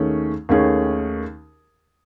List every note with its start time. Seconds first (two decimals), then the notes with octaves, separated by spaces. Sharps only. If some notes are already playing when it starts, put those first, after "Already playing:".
Already playing: D#2 D#3 A3 C#4 G#4
0.49 D#2 D#3 A3 C#4 G#4